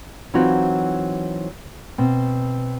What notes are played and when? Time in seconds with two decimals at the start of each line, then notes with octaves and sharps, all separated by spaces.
0.34 E3 F#3 C4 D#4 F4 F#4
1.98 B2 C4